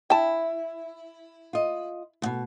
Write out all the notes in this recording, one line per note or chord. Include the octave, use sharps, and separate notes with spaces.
E4 G5 A5
F4 D#5
D#2 B2